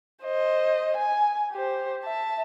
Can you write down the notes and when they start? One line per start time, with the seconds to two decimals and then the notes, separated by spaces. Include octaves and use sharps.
0.23 C5 D#5
0.97 G#5
1.52 G4 C5
2.03 E5 A5